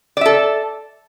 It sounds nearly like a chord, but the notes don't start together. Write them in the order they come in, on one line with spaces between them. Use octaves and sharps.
D5 E5 A4